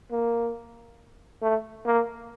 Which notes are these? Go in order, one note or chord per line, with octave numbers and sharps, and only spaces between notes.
A#3
A3
A#3